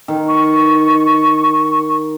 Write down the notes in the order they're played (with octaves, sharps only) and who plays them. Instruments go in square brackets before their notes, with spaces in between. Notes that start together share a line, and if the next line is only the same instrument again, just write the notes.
[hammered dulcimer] D#3
[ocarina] C#6